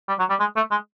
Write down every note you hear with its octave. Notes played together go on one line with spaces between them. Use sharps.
G3
F#3
G3
G#3
A3
G#3